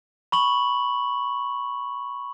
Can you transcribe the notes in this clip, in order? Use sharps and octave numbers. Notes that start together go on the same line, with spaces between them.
B5 C#6 F#7